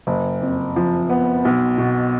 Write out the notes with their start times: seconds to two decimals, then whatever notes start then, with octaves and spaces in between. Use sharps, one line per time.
0.07 F#1
0.42 F2
0.76 F3
1.10 B3
1.45 B1
1.78 B2